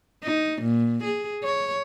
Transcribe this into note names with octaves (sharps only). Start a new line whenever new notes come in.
D#4
A#2
G#4
C#5